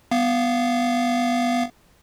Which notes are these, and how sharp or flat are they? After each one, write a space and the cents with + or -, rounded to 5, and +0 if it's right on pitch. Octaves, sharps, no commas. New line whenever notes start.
B3 +0 F5 -15